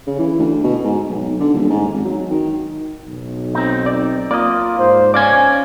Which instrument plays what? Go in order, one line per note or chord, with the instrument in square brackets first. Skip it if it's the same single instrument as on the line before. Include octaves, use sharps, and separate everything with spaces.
[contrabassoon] C#3
E3
D2
B2
G#2
B1
D3
D#1
G#2
G#1
F#3
D#3
[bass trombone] B1
[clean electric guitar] C4 D#4
[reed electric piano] D5
[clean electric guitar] A#3 [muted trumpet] F4 [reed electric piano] D5 D#6
[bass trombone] G#2 [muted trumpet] C5
[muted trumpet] C#4 [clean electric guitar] D5 F5 G#5 [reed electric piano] D6